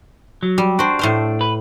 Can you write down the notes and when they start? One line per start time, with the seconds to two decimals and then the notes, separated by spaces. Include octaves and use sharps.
0.43 F#3
0.58 G3
0.79 D4 F#4 C5
0.99 A2 C5 F5
1.41 B4